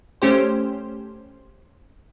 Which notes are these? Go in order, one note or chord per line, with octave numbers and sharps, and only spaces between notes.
A3 C#4 G4 C5